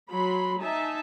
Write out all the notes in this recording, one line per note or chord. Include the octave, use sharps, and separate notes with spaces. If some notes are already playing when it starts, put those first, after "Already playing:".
F#3 B5 C6
D#4 E5 G#5 A5